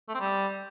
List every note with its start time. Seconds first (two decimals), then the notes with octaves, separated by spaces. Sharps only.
0.08 A3
0.14 C4
0.20 G3